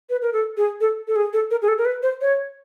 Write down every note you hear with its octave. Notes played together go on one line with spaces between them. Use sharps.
B4
A#4
A4
G#4
A4
A4
G#4
A4
A#4
G#4
A4
A#4
B4
C5
C#5